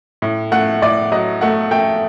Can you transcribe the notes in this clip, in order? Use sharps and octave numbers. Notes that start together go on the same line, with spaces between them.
A2
A3 F#5
A2 D5
F#3 D#5
A3 F#5
A3 G5